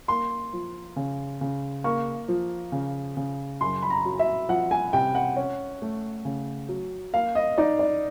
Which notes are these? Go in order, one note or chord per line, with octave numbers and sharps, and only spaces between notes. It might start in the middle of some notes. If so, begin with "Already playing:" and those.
A#3 C6
F3
C#3
C#3
A#3 C#6
F3
C#3
C#3
F#2 C6
B5
A#5
F#3
E5
F3 F#5
G#5
C3 G5
F#5
C#4
A3
C#3
F#3
A#3 F5
D#5
D#4 D5
D5